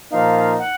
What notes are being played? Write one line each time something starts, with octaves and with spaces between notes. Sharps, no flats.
A#2 F3 A#3 D#4 F5
F#5